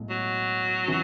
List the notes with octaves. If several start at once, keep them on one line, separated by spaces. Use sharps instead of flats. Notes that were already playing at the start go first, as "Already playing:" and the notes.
Already playing: B1 A2 G#3
F#3
E3